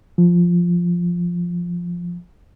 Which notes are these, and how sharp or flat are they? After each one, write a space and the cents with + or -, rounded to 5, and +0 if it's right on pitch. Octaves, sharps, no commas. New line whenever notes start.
F3 +0